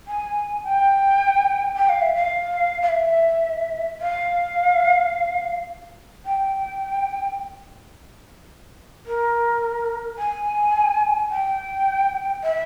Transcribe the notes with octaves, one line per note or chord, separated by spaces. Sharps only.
G#5
G5
G5
F5
E5
F5
F5
E5
F5
G5
A#4
G#5
G5
E5